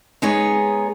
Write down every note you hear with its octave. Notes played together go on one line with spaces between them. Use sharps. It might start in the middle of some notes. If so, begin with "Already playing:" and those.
G#3 B3 D#4 G#4 C#5